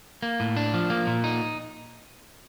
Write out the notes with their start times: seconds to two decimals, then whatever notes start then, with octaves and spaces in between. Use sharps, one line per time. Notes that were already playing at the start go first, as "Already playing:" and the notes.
0.23 A#3
0.40 A2
0.56 D4
0.74 F3
0.90 A#3
1.07 A#2
1.24 D#4